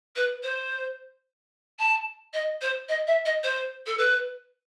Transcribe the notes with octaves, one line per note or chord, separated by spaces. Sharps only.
B4
C5
A5
D#5
C5
D#5
E5
D#5
C5
A4
B4